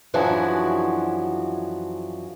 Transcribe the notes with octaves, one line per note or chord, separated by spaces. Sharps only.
F#2 E3 F3 D4 F#4 G#4